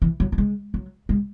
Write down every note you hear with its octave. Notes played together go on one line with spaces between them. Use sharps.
E3
F#3
F#3
G#3
F#3
G#3